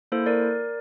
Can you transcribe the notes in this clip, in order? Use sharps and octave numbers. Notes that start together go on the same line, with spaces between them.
A#3 E4 A4 C5
A#4 D5